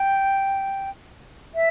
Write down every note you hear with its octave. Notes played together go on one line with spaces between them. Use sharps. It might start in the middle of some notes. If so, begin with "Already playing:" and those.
Already playing: G5
E5